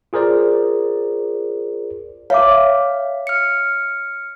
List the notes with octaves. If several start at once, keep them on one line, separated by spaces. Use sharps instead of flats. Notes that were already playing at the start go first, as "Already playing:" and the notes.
F4 G#4 A#4 C5 D5
C#5 E5 F5 D6
F6 C#7